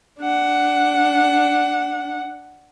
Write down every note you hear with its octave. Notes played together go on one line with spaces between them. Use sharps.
D4 F#5